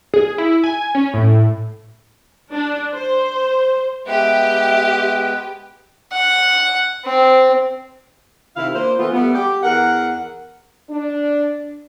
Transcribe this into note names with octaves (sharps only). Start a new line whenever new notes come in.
G#4
E4
G#5
C#4
A2
D4
C5
G#3 B3 G4 B4 E5
F#5
C4
C3 D#3 E4 F4 F5
A#3 D4 F4 C5
E3 A3 B3 F4
G3 A3 B3
G4
E2 A#4 F#5
D4